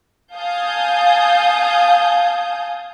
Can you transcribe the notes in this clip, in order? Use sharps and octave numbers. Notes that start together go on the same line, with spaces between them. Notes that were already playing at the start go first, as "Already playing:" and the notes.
F5 G#5 A5 D#6 G6